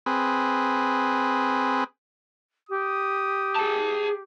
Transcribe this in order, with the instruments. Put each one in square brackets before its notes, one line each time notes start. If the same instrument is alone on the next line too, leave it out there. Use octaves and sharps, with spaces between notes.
[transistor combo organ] C4 G#4 B4
[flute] G4 [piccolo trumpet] D#6
[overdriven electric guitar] G#4 A5